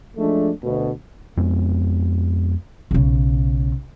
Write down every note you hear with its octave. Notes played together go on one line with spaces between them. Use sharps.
F3 G#3 A3 D4
D2 B2
F2 G#3 B3
B1 C#3